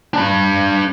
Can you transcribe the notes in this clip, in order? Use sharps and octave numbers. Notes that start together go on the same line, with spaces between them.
D4 B5